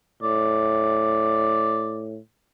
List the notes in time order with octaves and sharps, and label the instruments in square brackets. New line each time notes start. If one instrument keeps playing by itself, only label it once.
[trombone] A2 [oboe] D5